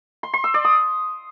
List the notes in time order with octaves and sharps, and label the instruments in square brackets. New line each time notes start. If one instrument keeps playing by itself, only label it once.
[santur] C6
C6
E6
D5
D#6